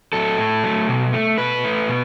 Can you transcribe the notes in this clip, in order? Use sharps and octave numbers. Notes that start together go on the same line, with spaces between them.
F#3 A3 A4
A2
F#3 A3
B2
A3
B2 B4
A3
B2